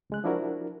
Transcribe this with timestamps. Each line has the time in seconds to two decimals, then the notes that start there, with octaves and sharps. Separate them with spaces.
0.10 C#2 G#3 F#6
0.24 F3 D4 E4 F#4 A#4